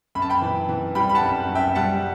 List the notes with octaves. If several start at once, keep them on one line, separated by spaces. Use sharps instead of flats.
F#2 B5
A5
G5 B5
E3
E3
G3 G5 B5
B5
F#5 A5
F#2
F#2
E5 G5
G3 F#5 A5